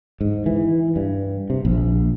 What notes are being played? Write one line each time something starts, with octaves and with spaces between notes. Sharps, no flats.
G#2
E3
G2
C3
A#1